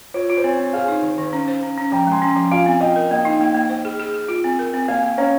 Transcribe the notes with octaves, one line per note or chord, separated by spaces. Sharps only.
F4 C#5
F4
C5
C4 C#5
C4
G#4 F5 G#5
D#4
D#3
D#3
C#4
C5
C#4
C#4
F3 G5 A#5
G#3 G#5 C6
C#4
F3
F4 F5 G#5
C4
F4 D#5 G5
A#4
A#3 D#5 G5
D#4
A#3
A#3
C5
G#4
G#4
G#4
F4
C4
A#4
C4
A#3 F5 G#5
A#3
C#4 C#5 F5